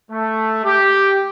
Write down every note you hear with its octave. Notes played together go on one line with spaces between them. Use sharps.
A3
G4